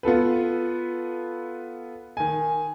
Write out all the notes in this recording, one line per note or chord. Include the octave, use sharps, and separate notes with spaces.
B3 F4 A4 B4
D#3 G#5